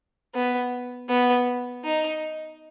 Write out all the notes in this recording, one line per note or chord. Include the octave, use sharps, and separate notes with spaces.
B3
B3
D#4